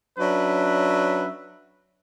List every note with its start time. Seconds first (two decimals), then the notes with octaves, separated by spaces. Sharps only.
0.19 F#3 C#4 D4 B4 E5